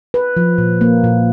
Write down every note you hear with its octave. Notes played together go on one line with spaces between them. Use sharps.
B4
F3
A#2
A#3
A#2